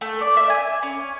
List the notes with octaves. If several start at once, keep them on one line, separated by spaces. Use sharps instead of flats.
A3
D5
E5
G#5
C#4